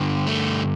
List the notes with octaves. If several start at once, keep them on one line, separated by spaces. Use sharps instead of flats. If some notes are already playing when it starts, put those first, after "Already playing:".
Already playing: G2 D3
A3